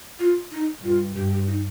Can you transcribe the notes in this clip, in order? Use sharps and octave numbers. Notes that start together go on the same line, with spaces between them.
F4
D#4
G2 F4
G2 G4
G4
D#4